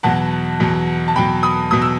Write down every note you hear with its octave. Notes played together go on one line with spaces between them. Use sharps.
E2 B2 F#3 F#5 A5
E2 B2 F#3
A5
E2 B2 F#3 G5 B5
B5 D#6
B2 F#3 D#6
E6